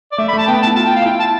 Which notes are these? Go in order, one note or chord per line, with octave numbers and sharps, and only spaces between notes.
D5
A3 E5
B5
A3
A5
B3 G5
B3 A5
E4
F4 A5
G5
F5
E4 G5
A5